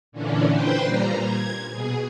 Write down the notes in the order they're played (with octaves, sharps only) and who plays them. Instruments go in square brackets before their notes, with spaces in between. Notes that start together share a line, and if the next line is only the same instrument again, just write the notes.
[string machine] A#2 D3 E3 C#4 D4
B4 C5 G5 C6
A#2 G3 A#5
G#6
B2 G#4